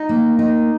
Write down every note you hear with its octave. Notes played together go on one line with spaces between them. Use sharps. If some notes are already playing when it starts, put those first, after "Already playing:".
Already playing: D#4
A#3
D#4